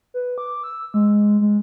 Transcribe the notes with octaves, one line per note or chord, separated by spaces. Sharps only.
B4
D6
E6
G#3
G#3